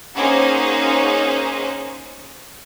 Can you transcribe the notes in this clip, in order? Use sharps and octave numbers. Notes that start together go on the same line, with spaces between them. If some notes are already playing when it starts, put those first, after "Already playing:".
A#3 C#4 D#4 G#4 C5 F#5